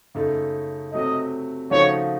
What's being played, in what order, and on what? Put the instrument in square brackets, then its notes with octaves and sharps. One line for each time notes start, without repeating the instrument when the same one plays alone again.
[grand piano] F#2 C#3 A3 D#4 A4
[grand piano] C3 F#3 A3 [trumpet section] D#5
[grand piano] C#3 F3 A3 D#4 F#4 [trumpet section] C#5